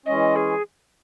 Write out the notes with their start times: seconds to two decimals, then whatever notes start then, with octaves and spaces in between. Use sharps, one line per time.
0.06 E3 G#3 C#4 D#5
0.36 G#4